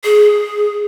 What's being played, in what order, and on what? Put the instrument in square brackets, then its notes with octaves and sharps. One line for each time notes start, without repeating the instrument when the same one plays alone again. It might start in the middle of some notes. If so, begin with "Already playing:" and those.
[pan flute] G#4